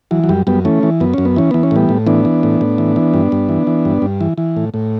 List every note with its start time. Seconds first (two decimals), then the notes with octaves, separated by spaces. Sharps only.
0.11 E3 F#3
0.24 F#3
0.29 F#2 G3
0.47 F#2 G3 B3
0.65 E3 A3 C#4
0.83 E3
1.00 F#2 B3
1.14 F#2 C#4
1.25 B3
1.36 E3 C#4
1.51 E3 B3
1.63 C#4
1.71 A2 G3 B3
1.89 A2
2.06 E3 B3 D4
2.25 E3
2.43 A2
2.61 A2
2.78 E3
2.96 E3
3.14 G2
3.32 G2
3.49 E3
3.67 E3
3.85 G2
4.02 G2
4.21 E3
4.38 E3
4.57 A2
4.74 A2